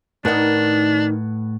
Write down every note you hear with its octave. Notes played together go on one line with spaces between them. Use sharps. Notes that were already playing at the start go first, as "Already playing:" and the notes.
A2 D#3 D4 D#4 B4 F#5